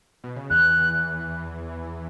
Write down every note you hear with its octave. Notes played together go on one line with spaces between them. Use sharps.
B2
C#3
E2 E3 F#6